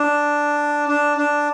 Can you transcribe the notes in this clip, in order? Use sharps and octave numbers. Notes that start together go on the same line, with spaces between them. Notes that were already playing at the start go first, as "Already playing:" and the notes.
Already playing: D4
D4
D4